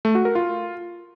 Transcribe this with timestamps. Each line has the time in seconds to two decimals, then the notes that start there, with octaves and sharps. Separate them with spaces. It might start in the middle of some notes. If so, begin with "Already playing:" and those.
0.05 A3
0.15 F#4
0.25 A#4
0.35 F4